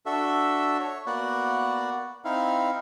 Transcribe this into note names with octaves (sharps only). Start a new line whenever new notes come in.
D4 F#4 A4 E5
C#5
A#3 B3 F#4 D5 F#5
C4 D#4 E4 F5